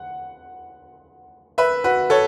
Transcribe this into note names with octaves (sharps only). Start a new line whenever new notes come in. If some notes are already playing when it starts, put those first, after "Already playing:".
Already playing: F#5
B4 E5
F#4 B4
A4 C#5